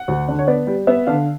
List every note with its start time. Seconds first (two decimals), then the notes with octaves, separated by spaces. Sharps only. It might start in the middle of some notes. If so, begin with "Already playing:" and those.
Already playing: F#5
0.08 D2
0.28 D3
0.39 C#5
0.47 B3 D5
0.67 G3
0.87 B3 E5
1.07 D3 F5